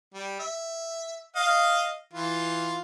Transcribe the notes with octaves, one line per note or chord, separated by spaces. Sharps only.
G3
E5
D#5 F5
E3 F4